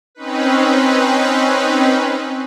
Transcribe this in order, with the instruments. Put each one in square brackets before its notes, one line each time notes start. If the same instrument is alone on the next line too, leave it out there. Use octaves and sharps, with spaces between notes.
[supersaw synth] C4 C#4 D#4 B4